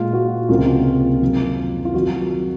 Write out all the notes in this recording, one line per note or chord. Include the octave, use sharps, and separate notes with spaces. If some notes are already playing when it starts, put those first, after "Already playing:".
Already playing: A#2 G#3 F4
F#4
C#2 C3 F3 A#3 F4
F2 D#3 F#3
F4
F2 D#3 F#3 F#4